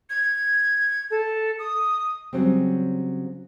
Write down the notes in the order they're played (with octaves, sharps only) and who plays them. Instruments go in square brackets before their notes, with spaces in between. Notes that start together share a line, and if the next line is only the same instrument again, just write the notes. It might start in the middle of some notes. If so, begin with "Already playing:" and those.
[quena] G#6
A4
D#6
[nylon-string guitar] C#3 F#3 G3 C4